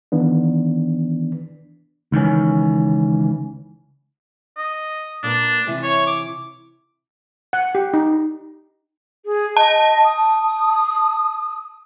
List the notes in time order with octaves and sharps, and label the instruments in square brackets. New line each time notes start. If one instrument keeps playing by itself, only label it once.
[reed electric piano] D#3 E3 B3 D4
[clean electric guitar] C#2 D#3 E3 C#4
[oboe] D#5
[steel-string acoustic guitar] A#2 A#3 B4 [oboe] D4
[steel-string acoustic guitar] C3 E3 E4
[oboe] C#5
D6
[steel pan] F#5
G4
D#4
[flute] G#4
[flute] D#5 [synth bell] A5
[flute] D#6